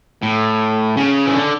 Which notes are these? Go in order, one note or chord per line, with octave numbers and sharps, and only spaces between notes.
A2
C#3
E3
D3